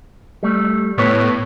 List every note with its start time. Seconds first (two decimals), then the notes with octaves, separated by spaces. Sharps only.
0.43 G3 A3
0.98 A2 B3 B4 C#5